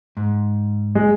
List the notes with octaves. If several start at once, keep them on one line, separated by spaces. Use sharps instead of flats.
G#2
G#3